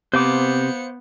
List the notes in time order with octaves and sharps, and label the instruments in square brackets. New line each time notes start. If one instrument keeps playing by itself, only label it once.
[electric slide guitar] C3 [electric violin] B3 C#7 [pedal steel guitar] C5 F5 D6